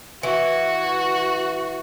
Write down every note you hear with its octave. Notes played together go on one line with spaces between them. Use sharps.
E3 F#4